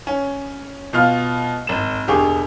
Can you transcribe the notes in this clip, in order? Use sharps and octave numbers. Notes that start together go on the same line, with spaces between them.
C#4
B2 F4 F5 F6
G#1 E7
E1 D3 G4 G#4 C#6